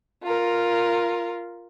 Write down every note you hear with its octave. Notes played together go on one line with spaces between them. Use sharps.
F4 A#4